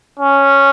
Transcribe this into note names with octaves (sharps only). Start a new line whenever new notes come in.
C#4